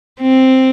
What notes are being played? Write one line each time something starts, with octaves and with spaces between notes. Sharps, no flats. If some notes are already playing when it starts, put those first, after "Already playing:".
C4